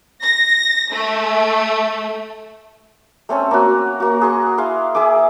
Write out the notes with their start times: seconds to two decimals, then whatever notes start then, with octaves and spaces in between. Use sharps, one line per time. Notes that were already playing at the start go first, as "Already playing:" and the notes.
0.21 A#6
0.91 A3
3.29 A3 C4 C#4 A4
3.51 A#3 C#4 F#4
4.00 A#3 F#4
4.21 G#4 C6 C#6
4.58 E4 G#4 F5 C6
4.95 G#4 E5 G#5 D6